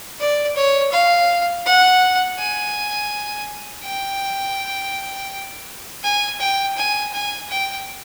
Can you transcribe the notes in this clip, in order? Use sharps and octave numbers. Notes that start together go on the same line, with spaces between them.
D5
C#5
F5
F#5
G#5
G5
G#5
G5
G#5
G#5
G5